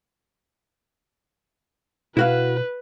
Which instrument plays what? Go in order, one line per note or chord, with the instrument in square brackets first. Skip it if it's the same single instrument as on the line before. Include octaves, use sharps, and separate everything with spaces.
[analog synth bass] B2 [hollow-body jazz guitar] E4 F#4 F5 [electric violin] B4